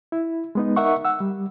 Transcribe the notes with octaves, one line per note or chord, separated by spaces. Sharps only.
E4
G#3 B3 D#4
D#4 A#4 E5 F#5 C#6
F#5 E6
G3